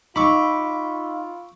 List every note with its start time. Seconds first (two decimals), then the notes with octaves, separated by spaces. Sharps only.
0.16 D#4 F4 B5 C#6 D6 E6